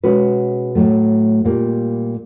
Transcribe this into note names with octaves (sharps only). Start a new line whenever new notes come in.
B2 G#3 C#4 F#4 B4
A2 F#3 A3
A#2 G3 A#3